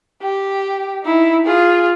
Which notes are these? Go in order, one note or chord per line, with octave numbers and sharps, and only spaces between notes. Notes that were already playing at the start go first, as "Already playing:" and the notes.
G4
D#4 E4
F4 G#4